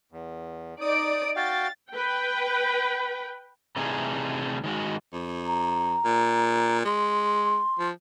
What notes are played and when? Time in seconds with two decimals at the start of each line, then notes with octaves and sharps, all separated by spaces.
0.12 E2
0.81 D#4 D5 D#6 D7
1.36 F#4 F5 G5 A6
1.92 B4 G5
3.76 C3 E3 G3 A3 D#4 G#4
4.64 D#3 G#3 F#4
5.13 F2
5.47 A#5
6.05 A#2
6.85 G#3 C6
7.79 F3